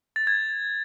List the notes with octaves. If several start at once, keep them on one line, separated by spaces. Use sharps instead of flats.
A6
G#6